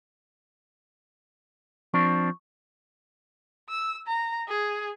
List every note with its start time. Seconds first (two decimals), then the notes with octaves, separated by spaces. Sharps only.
1.94 F3 C4 D4 C#6
3.69 E6
4.07 A#5
4.48 G#4